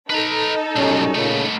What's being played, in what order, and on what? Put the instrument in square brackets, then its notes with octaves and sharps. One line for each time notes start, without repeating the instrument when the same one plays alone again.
[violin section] D#4 A4 [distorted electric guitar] B4 A#5
[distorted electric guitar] B1 A2 [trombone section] F#2 G3 C#4
[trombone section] A#2 C#3 [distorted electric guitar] A3 B3